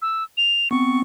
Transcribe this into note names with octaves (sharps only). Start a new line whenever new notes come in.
E6
F7
B3 C4 C#6